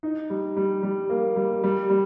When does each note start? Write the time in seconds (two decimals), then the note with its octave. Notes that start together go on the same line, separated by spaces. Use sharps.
0.03 D#4
0.30 G3
0.57 G3
0.83 G3
1.10 A#3
1.36 G3
1.64 G3
1.90 G3